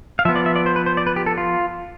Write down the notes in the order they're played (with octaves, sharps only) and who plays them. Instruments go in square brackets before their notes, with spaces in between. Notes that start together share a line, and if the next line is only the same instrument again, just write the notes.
[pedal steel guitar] F5
F3 E5
B3
D5
E5
D5
C5
B4
C5
D5
B4
G4
A4
F4